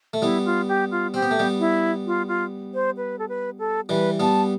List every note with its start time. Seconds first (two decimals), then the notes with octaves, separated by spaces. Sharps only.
0.13 A3
0.22 G3 B3 E4
0.45 F4
0.68 G4
0.91 F4
1.14 C4 G4
1.22 B3
1.31 A3
1.39 G3 B3
1.59 E4
2.06 F4
2.28 F4
2.74 C5
2.97 B4
3.19 A4
3.29 B4
3.59 A4
3.89 E3 G3 B4
4.20 G3 B3 A5